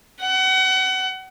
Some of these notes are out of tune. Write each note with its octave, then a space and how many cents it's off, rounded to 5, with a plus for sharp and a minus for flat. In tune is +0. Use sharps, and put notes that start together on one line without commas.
F#5 +30